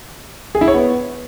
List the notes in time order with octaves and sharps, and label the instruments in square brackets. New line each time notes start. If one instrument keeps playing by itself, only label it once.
[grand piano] G#4
E4
C#5
B3